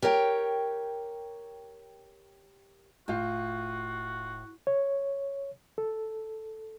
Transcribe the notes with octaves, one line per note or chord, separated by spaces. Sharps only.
G4 A#4 C#5 F#5 G5
E1 A2 F4 F#4 G6
C#5
A4